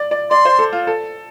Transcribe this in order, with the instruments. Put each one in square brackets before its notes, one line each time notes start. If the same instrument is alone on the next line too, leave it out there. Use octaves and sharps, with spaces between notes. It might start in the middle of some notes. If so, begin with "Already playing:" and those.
Already playing: [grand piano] D5
D5
[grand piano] D5 [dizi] C6
[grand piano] C5
A4
F4
A4